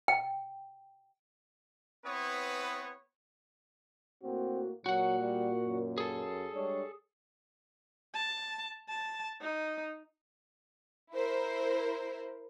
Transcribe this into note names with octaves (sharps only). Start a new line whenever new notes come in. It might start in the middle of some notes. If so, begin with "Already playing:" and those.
G5
B3 C4 E4 B4 C#5 D#6
A2 A#3 C4 F#4
A#2 F#3 F#4 F#5
G3
F#2
G#4 A4
G3 G#3 D4 C#5
A5
A5
D#4
E4 A#4 C5